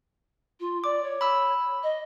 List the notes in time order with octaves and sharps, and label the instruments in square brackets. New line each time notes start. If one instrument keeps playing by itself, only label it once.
[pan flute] F4
[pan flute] D5 [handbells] D6
[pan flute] C#5
[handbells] B5 E6
[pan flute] D#5